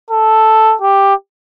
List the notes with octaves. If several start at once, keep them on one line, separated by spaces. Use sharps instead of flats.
A4
G4